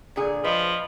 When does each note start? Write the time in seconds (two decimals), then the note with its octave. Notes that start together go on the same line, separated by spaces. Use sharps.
0.16 A#2 D3 G#4
0.44 F3 B4 D#5